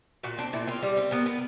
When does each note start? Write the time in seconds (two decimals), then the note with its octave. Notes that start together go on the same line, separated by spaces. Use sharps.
0.23 A#2 F#4
0.38 C4 D4
0.53 A#2 E4
0.67 C4 F4
0.82 G3
0.97 C4
1.11 B3 A#4
1.26 B3